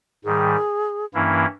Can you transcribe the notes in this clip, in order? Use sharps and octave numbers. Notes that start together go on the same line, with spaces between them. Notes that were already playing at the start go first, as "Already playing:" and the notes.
G#2 D#3 G3 G#4
G2 E3 A#3 C#4 E4